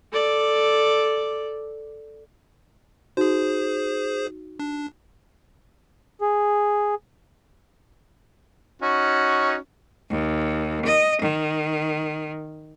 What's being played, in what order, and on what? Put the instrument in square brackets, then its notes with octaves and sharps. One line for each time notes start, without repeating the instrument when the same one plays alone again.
[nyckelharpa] A4 D5
[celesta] D#4 F#4 [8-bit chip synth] G#4 C5
[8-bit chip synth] D4
[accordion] G#4
[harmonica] C#4 D#4 F#4
[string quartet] D#2
D#5
D#3